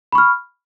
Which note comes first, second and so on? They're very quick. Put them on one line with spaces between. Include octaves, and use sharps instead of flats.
B5 C#6 F6